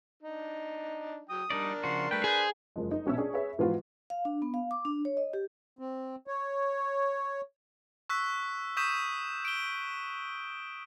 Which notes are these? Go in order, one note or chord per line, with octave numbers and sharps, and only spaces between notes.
D4 D#4
F#3 G5 D#6
G3 D4 D#4 A#4 D5
C#3 F3 F#4 C6
G3 A3 B4 G5
G#4 C5 G6
F#1 F3 G#3
D#4
A#1 B2 C#4 E5 E6
C#4 D4 G#4
G#4 B4 C#5 E5
G#2 E3 F3 B3 F4 F#4
F5
D4
B3
F5
D6
D4
C#5
D#5
G4
C4
C#5
C#6 E6 F#6 B6
C#6 D#6 G6 B6 D#7 E7
D7 G7